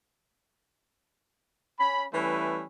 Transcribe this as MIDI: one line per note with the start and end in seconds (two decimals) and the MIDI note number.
1.80 2.06 61
1.80 2.06 83
2.14 2.65 52
2.14 2.65 55
2.14 2.65 57
2.14 2.65 61
2.14 2.65 71